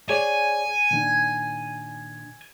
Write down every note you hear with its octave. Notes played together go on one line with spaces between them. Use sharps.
G#4 C#5 D5 G#5
A#2 D#3 D4